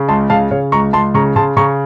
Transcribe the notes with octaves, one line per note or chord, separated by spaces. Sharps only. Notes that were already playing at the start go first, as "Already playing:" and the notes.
Already playing: C#3
C#2 A5 C6
C#3 F5 A5
C#3 C#5 F5
C#2 A#5 C#6
C#2 A5 C6
C#3 A#5 C#6
C#3 A5 C6
C#3 A#5 C#6